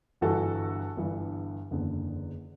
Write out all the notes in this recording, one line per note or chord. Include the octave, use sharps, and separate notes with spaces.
G1 G2 E3 F#4 A4
G1 G2 E3
F#1 E2 D3